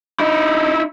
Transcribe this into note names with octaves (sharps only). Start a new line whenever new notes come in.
D#4 E4